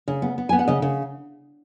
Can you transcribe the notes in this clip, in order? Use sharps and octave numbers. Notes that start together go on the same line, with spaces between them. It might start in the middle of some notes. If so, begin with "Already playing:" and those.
C#3
B3
B3
B3 G#5
F#5
C#3 D#5
C#3